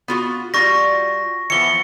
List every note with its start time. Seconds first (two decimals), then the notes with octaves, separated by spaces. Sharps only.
0.08 B3 F4 F#4
0.54 G3 F4 F#4 C#6 A#6
1.50 E3 F3 B3 C#7 G7